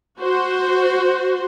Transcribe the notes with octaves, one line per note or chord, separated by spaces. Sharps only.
F#4 C5